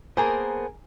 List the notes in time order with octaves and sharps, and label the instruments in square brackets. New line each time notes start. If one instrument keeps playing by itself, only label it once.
[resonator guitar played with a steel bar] A#3 G#4 A#4 [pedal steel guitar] B3 C5 A5 [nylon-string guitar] G#5